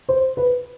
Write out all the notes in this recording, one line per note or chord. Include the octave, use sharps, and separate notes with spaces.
C5
B4